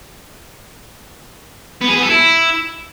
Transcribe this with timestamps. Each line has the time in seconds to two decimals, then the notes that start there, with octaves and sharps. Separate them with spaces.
1.82 B3
1.89 G#4
1.96 B3
2.03 A4
2.10 E4